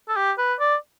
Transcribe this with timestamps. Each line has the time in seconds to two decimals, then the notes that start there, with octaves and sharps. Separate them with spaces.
0.09 A4
0.16 G4
0.38 B4
0.60 D5